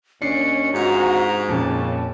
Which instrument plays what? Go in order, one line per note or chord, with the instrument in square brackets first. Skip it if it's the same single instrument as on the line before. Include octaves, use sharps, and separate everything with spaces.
[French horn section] D#2 C#4 [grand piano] D4 C7 [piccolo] C#7
[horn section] G#2 [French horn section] C3 F4 F#4 [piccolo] A#5
[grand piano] F2 A#2 [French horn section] C#3 C#4 [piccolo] A5